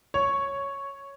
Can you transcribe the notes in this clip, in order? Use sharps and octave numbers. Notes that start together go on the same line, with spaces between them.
C#5